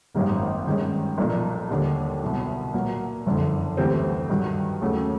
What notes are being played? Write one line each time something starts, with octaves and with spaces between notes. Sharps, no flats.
G#1 F#2 D#3 G3 A#3
G2 D#3 G#3 C#4
B1 A#2 F3 A#3 D4
D#2 D3 G3
C2 B2 F#3
A#2 F#3 A#3
F#1 F2 D3
D2 C3 E3 G3 C4
G2 D#3 F#3
D#2 C#3 F#3 A3 C#4